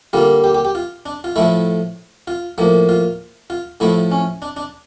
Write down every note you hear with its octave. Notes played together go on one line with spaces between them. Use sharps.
D3 G3 A#3 F4
G4
G4
G4
F4
D4
F4
A2 F3 A3 E4
F4
A2 F3 A#3
F4
F4
A2 F3 A3 E4
C#4
D4
D4